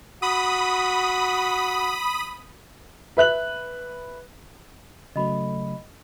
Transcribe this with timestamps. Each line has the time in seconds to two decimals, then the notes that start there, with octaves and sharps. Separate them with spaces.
0.22 F#4 B5 D#6
3.17 B4 E5 F#6 F#7
5.16 C#3 F#3 A3 D#5 B5